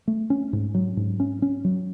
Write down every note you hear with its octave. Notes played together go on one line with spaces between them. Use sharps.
A3
C#4
G#2
F#3
G#2
C#4
C#4
F#3